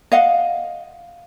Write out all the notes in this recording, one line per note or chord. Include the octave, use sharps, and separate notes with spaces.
D#5 F5 F#5